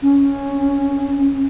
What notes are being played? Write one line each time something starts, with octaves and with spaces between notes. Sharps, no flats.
C#4